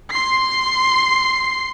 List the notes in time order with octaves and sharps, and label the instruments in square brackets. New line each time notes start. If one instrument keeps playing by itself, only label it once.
[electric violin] C6 C7